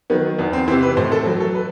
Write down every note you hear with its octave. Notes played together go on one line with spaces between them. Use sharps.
D#3 F#3 B3
E2 B3
C4
C3 E3 C4
B4
A2 C5
A4
F#3
A4
B4